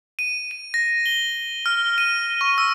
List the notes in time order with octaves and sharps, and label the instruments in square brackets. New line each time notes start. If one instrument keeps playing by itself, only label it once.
[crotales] D#7
D#7
A#6
G7
F6
D#7
C#6
E6